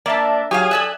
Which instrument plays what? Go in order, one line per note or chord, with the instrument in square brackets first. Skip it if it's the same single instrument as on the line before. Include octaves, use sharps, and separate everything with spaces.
[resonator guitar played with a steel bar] A#3 D4 [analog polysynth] D5 E5 A5
[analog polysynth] F#3 [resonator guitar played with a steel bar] G4 G#4 F5 [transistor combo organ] G#5 D#6
[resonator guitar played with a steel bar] A4 D5 E5 [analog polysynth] F#6